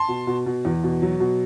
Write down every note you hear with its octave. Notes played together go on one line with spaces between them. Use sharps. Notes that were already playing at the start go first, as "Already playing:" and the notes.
Already playing: A5 C6
B2
B2
B2
E2
B2
F#3
B2